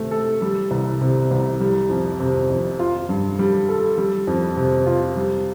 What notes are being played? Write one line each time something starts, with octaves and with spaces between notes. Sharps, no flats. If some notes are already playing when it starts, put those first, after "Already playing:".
Already playing: C3 A3
A4
G3
C2
C3
C2
G3
F2
C3
F2
F4
G2
G3
A4
G3
F2
C3
F4
G3